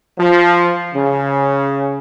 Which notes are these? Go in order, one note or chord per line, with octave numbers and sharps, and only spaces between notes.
F3
C#3